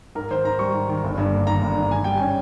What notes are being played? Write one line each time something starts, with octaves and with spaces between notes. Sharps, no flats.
G#2 A#4
D#3 C5
G#2 A#5
G3 C#6
G#2
D#3
G1
G2
A#3
D#3 A#5
G1
G2
G#2 G#5
G3 G5
C#4 G#5